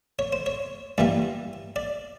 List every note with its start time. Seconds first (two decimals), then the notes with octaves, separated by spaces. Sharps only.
0.19 C#5
0.33 C5
0.46 C#5
0.98 G2 E3 G3 A#3 D5
1.76 D5